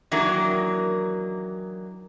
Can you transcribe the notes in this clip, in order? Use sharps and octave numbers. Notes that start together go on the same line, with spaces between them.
D#3 E3 F#3 A#3 D4 A#4